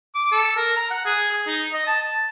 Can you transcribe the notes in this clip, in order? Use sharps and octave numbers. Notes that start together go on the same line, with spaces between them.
D6
A4
A#4
A#5
F#5
G#4
G#4
D#4
D#5
A5
A5